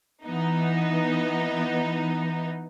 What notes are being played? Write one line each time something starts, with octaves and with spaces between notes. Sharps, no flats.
E3 B3 D#4